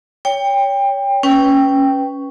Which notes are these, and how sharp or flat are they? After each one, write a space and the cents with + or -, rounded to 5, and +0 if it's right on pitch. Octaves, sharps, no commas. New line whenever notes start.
C#5 +25 G5 +20
C#4 +0 B4 +0 G5 +0